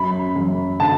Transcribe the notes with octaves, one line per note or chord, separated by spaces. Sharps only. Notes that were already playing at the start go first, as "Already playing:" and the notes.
Already playing: F#2 B5
F#2
D3 A5